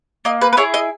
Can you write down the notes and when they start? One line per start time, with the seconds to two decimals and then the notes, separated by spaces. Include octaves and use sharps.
0.25 A#3 D#5
0.41 B4
0.53 B4
0.57 E4 G#4 C#5
0.74 D#5